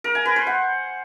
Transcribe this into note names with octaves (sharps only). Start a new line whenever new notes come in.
A#4
G#5
B4
C5
F#5